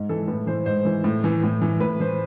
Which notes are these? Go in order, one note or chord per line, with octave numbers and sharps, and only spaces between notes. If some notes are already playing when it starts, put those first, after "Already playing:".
Already playing: G#2
E3 A4
A2 B4
E3 C5
G#2 C5
E3
A2
E3
A2
E3
A2 B4
E3 C5